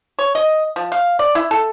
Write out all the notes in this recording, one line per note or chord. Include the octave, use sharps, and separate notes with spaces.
C#5
D#5
F3
F5
D5
E4
A4